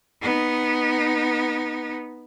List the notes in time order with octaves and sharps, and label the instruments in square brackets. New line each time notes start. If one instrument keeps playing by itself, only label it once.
[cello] B3 D#4